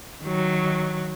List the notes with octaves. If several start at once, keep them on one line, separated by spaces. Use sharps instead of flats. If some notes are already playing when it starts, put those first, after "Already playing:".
D#3 F#3